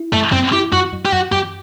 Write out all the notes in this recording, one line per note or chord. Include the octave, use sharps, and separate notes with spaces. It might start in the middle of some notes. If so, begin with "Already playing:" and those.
Already playing: E4
F#2 A3
F#2 C4
E4 G4
F#2 F#4
F#2
G4
F#2 F#4
F#2 G4